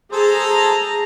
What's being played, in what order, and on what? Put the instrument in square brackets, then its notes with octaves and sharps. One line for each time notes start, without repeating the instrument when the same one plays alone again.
[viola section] G#4 A#5 [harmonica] A4 C5 A5